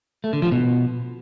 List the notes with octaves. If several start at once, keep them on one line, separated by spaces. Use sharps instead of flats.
A3
D3
F3
B2